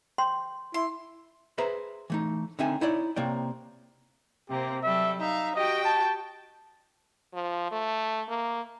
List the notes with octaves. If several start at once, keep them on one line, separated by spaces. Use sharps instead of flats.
G5 C6
E4 C6
G#4 B4 C5 E5 A#5
E3 A3 D#4
D3 C4 D#4 E5 G#5
D#4 E4 C#5 D5
C3 A#3 C#5 D5 G5
C3 A#3 C4 G4
F#3 G3 A4 E5
D#4 E5 F5
F#4 G4 D#5 G5
A5
F3
A3
A#3